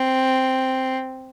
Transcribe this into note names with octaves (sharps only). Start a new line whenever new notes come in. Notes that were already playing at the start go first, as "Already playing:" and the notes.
Already playing: C4